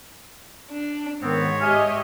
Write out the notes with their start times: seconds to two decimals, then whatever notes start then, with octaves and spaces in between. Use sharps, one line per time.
0.71 D4
1.22 G#2 D#3 B3 C4 C#5
1.62 G4 D#5 E5 G#5 F6